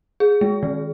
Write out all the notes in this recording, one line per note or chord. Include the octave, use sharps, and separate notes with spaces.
G#4
G#3
D#3